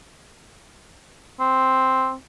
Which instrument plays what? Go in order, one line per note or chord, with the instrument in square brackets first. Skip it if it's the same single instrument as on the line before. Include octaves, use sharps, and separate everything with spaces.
[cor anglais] C4